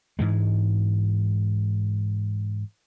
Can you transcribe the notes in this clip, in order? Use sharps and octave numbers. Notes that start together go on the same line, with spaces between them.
G#2 E3 G#3